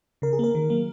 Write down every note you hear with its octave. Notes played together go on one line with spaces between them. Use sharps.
C#3 A#4
G#4
A#3 A#4
D#3
F#3 A#3